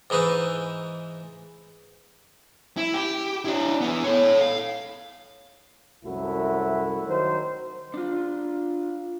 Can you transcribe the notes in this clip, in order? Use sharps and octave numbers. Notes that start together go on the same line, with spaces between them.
G#2 E3 D#4 B4 E5
E4
G4
D4 E4
B3 E4
A4 C#5
F5
C2 F#2 A3 E4 F#4
D#3 F#3 A#4 C5
D4 F4